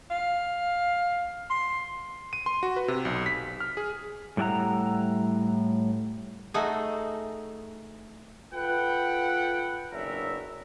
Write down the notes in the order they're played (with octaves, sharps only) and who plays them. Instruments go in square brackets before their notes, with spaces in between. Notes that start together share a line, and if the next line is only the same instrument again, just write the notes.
[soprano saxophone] F5
C6
[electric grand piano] D#7
C6
F#4
B4
C3
B1
B6
F6
G#4
[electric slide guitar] A2 G3 D4 E4 F#5 A#5
[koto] A3 D#4 F#4 G#4
[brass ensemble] F4 A4 B4 F#5 G5
F#1 B2 D4 A#4 E5